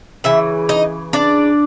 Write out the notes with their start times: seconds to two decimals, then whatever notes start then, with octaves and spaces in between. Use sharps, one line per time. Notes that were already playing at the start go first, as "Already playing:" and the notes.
0.24 C#3 E3 E5
0.69 D#4 D#5
1.13 D4 D5